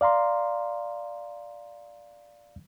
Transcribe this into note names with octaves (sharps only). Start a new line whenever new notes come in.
D5 F5 A#5 C6